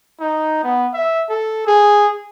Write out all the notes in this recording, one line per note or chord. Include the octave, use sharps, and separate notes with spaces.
D#4
B3
E5
A4
G#4